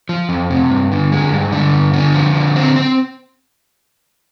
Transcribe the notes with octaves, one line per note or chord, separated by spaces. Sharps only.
F3
F2
C3
G2
D3
G#3
G2
D3
G2
D3
F3
D3
C4
C4